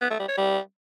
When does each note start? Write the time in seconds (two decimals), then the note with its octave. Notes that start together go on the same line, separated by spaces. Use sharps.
0.01 B3
0.10 A3
0.19 G3
0.28 C#5
0.37 G3